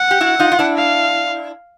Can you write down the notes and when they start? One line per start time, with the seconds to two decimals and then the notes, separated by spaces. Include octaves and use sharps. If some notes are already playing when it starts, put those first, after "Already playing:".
Already playing: F#5
0.11 G4
0.21 E4 F#4
0.39 D#4 F4
0.52 F4
0.59 D4 E4
0.78 F5